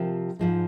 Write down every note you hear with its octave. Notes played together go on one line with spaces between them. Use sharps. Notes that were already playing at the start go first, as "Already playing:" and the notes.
Already playing: C3 F3 C4 G4 A#4
G#2 F3 G#3